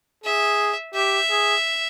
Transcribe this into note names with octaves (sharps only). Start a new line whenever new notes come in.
G#4 E5
G4 E5
G#4